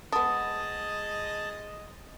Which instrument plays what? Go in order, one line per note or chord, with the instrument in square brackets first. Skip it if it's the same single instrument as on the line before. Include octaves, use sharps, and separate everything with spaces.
[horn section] G#3 D#5 [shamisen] B3 D4 [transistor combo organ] A5 [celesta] D#6